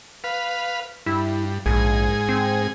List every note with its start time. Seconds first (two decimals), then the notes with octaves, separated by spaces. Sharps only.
0.24 B4 F5
1.06 G2 E4
1.66 A#1 G#2 G#4
2.29 C4